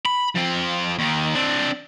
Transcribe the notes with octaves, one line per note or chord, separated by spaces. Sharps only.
B5
F3 C4
D#2 D#3
C4 D4